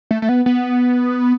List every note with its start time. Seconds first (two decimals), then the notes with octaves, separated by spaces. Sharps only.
0.11 A3
0.22 A3
0.29 B3
0.46 B3